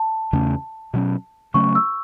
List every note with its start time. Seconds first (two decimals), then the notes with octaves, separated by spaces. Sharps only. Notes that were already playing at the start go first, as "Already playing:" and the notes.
Already playing: A5
0.33 E2 C#3 A3 C#4
0.94 B2 F#3 C#4
1.54 C#3 F#3 A3 C#4 C#6
1.75 E6